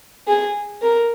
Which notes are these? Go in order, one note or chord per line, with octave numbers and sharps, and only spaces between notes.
G#4
A#4